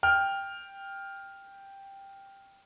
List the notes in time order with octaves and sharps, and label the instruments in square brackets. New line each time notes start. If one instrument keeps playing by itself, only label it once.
[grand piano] G5 F6